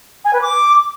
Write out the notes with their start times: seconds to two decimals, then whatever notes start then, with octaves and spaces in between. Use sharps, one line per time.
0.24 G#5
0.33 B4
0.41 D6